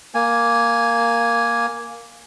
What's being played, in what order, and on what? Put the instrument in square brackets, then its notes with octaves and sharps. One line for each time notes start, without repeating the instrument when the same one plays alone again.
[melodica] A#3 G#5